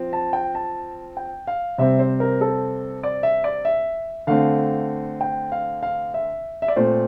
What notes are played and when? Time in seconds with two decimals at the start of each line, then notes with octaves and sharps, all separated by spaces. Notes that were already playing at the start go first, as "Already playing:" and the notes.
Already playing: F3 C4
0.13 A5
0.33 G5
0.55 A5
1.17 G5
1.47 F5
1.78 C3 G3 C4 E5
1.99 C5
2.20 A#4
2.41 A4
3.03 D5
3.23 E5
3.44 D5
3.65 E5
4.27 D3 A3 C4 F5
5.21 G5
5.52 F5
5.83 F5
6.14 E5
6.62 E5
6.68 D5
6.76 A#2 A3 C4 C5